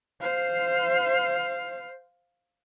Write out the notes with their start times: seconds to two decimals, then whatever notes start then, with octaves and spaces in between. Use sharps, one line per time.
0.21 C5 F5